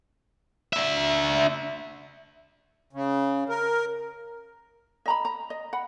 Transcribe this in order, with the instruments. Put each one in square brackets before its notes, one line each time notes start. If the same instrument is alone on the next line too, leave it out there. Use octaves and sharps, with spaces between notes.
[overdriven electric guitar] D4 E5
[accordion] C#3
A#4
[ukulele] D#5 A#5 B5
A#5
D#5
F#5 B5